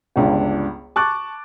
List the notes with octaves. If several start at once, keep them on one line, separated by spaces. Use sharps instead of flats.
G1 C#2 D4
A5 C#6 D6 F#6 A6